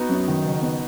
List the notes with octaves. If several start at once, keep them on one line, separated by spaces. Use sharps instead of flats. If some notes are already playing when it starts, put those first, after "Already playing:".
Already playing: B3 D#4 F#4
F#2
D#3
F#1
B3